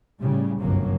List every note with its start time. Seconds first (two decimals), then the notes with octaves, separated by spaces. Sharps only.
0.20 A2 C#3 G3
0.59 G1 C#2 F#2 C3 F#3 A#3